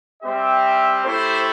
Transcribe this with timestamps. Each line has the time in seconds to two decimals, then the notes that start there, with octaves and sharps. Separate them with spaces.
0.22 G3 C4 G4 E5
1.05 A3 E4 G4 C5